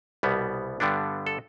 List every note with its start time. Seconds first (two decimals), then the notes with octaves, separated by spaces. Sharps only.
0.23 C2 B2 G3 B3
0.80 G2 D3 G3 B3 D4
1.27 A4